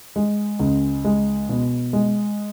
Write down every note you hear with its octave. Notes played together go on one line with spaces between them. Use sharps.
G#3
C#2
G#3
B2
G#3